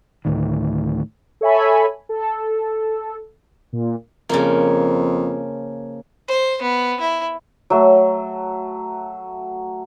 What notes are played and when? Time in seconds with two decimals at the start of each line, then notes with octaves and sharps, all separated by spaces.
0.25 D2 A2 D#3
1.41 A4 C#5 E5 G#5 B5
2.09 A4
3.73 A#2
4.29 F2 C#3 F3 A#3
6.28 C5
6.62 B3
7.00 E4
7.70 F#3 A3